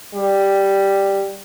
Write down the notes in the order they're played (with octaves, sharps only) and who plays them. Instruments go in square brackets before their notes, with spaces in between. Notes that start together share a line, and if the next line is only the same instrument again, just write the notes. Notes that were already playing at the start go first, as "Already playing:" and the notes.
[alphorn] G3